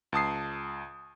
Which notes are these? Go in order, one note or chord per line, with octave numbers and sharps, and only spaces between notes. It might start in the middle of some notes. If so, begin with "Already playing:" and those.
C#2 A5 D#6 C7